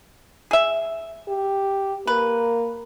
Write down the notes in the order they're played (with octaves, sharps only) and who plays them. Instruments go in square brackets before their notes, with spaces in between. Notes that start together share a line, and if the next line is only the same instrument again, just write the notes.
[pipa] G#4 E5
[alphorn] G4
[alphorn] A#3 [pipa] B4